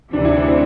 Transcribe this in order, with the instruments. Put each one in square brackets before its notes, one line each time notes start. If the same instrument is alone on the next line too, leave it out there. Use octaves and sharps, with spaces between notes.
[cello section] D2 C3 E3 [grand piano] D4
[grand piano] E4
D4
C4